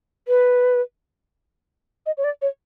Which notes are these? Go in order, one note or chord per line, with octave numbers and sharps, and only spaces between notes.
B4
D#5
C#5
D5
C#5